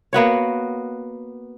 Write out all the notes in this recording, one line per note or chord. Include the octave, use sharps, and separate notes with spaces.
A#3 B3 F#4 C#5